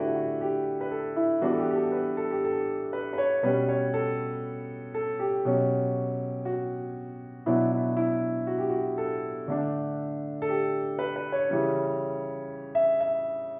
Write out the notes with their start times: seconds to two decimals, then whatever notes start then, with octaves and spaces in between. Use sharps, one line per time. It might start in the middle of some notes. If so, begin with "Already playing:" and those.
Already playing: D3 A3 D4 E4 F#4 G4 A4 B4
0.15 F#4
0.41 G4
0.81 B4
0.91 A4
1.16 E4
1.41 E3 G3 B3 D4 F#4
1.53 A4
1.59 G4
1.70 G4
1.75 A4
1.92 B4
2.17 A4
2.31 G4
2.44 A4
2.93 B4
3.13 B4
3.18 C#5
3.43 B2 G3 C#4 B4
3.69 C#5
3.94 A4
4.94 A4
5.19 G4
5.45 B2 F#3 C#4
6.45 F#4
7.46 B2 F#3 B3 D4 E4
7.72 E4
7.97 E4
8.47 F#4
8.58 G4
8.70 F#4
8.98 A4
9.48 D3 A3 D4
10.42 A4
10.49 G4
10.99 B4
11.16 B4
11.32 C#5
11.49 C#3 E3 G3 C#4
12.75 E5
13.01 E5